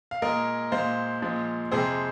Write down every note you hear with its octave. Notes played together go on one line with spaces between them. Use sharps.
F5
A#2 G#3 A#4 D#5
A#2 G#3 C5 F5
A#2 F3 G#3
F2 C3 G#3 G#4 C5